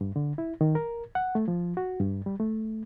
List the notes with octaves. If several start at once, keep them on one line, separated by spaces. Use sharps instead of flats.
G2
D3
E4
D#3
A#4
F#5
A3
F3
F#4
G2
G3
A3